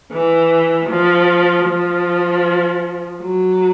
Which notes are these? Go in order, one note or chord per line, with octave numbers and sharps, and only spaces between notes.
E3
F3
F3
F#3